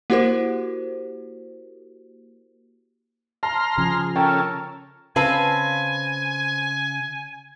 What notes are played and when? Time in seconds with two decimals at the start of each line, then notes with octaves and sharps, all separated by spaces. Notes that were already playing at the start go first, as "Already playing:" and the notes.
0.10 A#3 E4 F#4 G4 A#4 C5
3.43 A5 A#5 C6 F6
3.78 C#3 F3 G#4
4.16 C#4 A4 A#4 G5
5.16 C#3 C4 B4 F5 G#5 A5